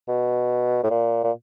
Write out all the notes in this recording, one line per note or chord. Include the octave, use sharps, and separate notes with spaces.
B2
A2
A#2
A#2